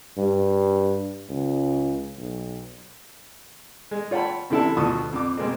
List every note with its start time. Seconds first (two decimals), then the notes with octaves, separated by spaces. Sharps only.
0.17 G2
1.29 C#2
2.18 B1
3.91 G#3
4.11 F4 C#5 F#5 G5 A5 B5
4.50 F#2 C3 E3 E4 A4 A5
4.77 D2 B2 F3 A5 C#6 D#6
5.13 F2 D6
5.37 B2 G#3 A#3 C4